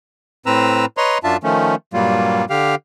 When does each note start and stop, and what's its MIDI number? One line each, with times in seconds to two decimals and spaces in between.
0.46 0.86 45
0.46 0.86 60
0.46 0.86 71
0.46 0.86 82
0.46 0.86 88
0.97 1.18 71
0.97 1.18 73
0.97 1.18 75
0.97 1.18 82
0.97 1.18 84
1.24 1.37 42
1.24 1.37 62
1.24 1.37 65
1.24 1.37 76
1.24 1.37 81
1.44 1.75 51
1.44 1.75 53
1.44 1.75 57
1.44 1.75 61
1.94 2.45 43
1.94 2.45 46
1.94 2.45 54
1.94 2.45 55
1.94 2.45 58
1.94 2.45 65
2.50 2.75 50
2.50 2.75 67
2.50 2.75 77